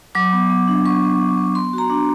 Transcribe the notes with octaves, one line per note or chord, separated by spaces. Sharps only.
F#3 D6
B3
B3
D4
F#3 C#6
B3
D4
B3
B3 C6
F#4
A#5
D4